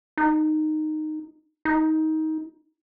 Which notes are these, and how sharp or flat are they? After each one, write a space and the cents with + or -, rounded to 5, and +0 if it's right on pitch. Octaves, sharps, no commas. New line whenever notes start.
D#4 -10
D#4 +20